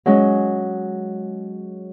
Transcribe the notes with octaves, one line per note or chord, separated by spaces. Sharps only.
F#3 G#3 C#4